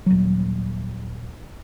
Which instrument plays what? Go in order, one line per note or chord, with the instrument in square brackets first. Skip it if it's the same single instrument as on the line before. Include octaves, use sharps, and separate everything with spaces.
[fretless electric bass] D#1 F#3